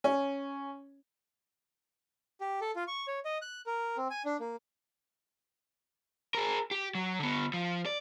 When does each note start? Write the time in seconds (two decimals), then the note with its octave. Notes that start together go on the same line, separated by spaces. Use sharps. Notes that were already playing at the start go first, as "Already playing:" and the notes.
0.04 C#4
2.41 G4
2.61 A4
2.76 F4
2.88 C#6
3.08 C#5
3.25 D#5
3.42 F#6
3.66 A#4
3.97 C4
4.10 G#5
4.25 D4
4.40 A#3
6.35 G#4 A#4
6.71 G4
6.95 F#3
7.19 D3 B3
7.54 F3
7.86 D5